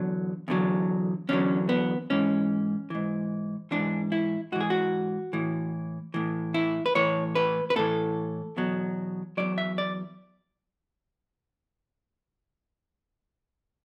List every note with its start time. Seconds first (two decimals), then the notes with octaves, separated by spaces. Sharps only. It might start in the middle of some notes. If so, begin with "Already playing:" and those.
Already playing: E2 D3 F#3
0.48 E2 D3 F#3
1.29 E2 D3 F#3 C#4
1.69 B3
2.10 G#2 E3 C#4
2.90 G#2 E3
3.71 G#2 E3 D4
4.12 E4
4.52 G#2 E3 F#4
4.60 G#4
4.70 F#4
5.33 A2 E3
6.14 A2 E3
6.54 E4
6.86 B4
6.95 A2 E3 C#5
7.35 B4
7.70 B4
7.76 A2 E3 A4
8.57 E2 B2 F#3
9.37 E2 B2 F#3 D5
9.58 E5
9.78 D5